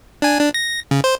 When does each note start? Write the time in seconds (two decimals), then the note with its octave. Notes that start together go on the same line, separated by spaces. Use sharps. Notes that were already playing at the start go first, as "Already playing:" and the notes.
0.22 D4 G#5
0.40 D4
0.54 A#6
0.91 C#3
1.04 C5